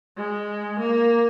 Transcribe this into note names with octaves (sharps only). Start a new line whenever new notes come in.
G#3
A#3